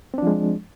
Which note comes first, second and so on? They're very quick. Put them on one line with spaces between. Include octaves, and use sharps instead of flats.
C4 D4 F3 G#3